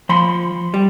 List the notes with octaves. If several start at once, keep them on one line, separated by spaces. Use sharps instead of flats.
F3 B5 C6
G3